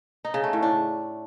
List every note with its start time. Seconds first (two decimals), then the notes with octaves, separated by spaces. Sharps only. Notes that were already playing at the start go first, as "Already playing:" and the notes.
0.25 D#4
0.34 C#3
0.44 A3
0.53 A2
0.63 D4